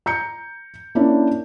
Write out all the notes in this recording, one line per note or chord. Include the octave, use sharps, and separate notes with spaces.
A#5 G6 C#7
A#3 C#4 D4 E4